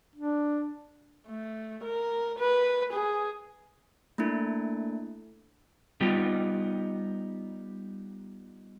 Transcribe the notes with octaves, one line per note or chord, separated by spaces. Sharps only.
D4
A3
A#4
B4
G#4
A3 A#3 D4 E4 A4
G3 B3 D#4 F4 G4